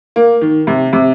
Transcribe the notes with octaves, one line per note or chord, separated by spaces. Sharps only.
A#3
D#3
C3
C3